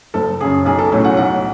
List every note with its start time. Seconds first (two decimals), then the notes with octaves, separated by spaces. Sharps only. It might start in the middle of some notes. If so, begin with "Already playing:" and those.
0.14 F#1 A4
0.40 F#2 C#3 G#4
0.65 B1 G#4
0.79 A4
0.92 A2 F#3 A3 C#4 G#5
1.05 F#5
1.17 B1 F#5